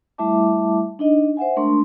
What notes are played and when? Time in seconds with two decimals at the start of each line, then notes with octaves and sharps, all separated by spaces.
0.18 G3 A3 E4 E5 A5 D6
0.99 D4 D#4 D#5
1.37 C5 E5 F#5 G#5
1.57 G#3 A3 D4 A#4 C6 C#6